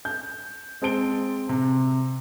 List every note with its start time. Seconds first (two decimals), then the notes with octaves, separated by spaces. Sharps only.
0.05 G6
0.82 G#3 C4 A5 D7 G7
1.49 C3